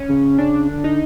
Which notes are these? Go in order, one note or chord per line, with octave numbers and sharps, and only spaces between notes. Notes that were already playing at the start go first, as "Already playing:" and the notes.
Already playing: C#4
C#3
C#3 D4
D3
D#4